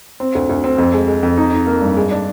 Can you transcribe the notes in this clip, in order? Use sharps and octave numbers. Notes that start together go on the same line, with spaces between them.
C4
D2
D2
C4
F2
G#3
G#3
F2
D#4
D#4
A#3
G2
G#3
D4